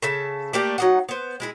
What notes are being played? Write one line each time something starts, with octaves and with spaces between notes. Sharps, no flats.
C#3 A4 E5 A5
A3 A#3 G4 D5
F#3 D#4 F#5
B3 C5
G#3 E4 G#4